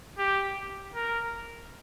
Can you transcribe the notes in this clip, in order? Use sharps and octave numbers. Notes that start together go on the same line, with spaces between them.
G4
A#4